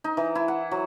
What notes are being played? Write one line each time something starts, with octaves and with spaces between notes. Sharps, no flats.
D#4
E3
E4
F#5
F#3